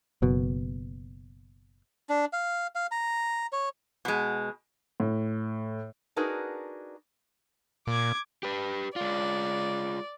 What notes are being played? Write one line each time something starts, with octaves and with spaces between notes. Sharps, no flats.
F#1 B2
D4
F5
F5
A#5
C#5
B2 G#3
A2
D4 D#4 F#4 G#4 A#4 B4
A#2 D6 G#6
G4 B4
G#3 F4 D5